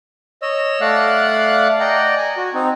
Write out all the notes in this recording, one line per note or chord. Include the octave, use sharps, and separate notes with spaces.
C#5 D#5 E6
A3 D5 F5 F#5 F#6
D5 D#5 F#5 G5 A#5
G#5
F#4
C4 D#4